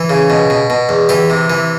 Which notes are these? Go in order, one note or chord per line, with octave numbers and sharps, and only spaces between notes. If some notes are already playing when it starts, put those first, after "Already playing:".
Already playing: E3
C#3
B2
B2
B2
E2
E3 G4
C3
E3